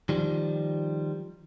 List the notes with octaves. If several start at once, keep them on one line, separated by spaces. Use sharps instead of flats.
D#3 F3 G3